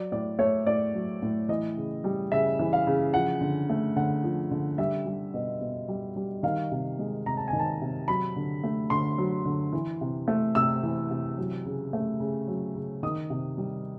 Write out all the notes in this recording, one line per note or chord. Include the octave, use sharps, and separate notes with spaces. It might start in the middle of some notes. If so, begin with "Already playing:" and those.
Already playing: F#3 D5
A2 D5
A3 C#5
A2 D5
F#3
A2
E3 D#5
C#3
G3
C#3 E5
E3
F5
C#3
F3 F#5
D3
A3
D3 F#5
F3
D3
G3 E5
G3
B2
B2
G3
G3
D#3 F5
C3
G#3
C3 A#5
A5
G#5
D#3
A5
C3
F#3 B5
D3
A3
D3 C6
F#3
D3
E3
C3
A3
C3 E6
E3
C3
F#3
C#3
A3
C#3
F#3
C#3
D#3 D#6
C3
G3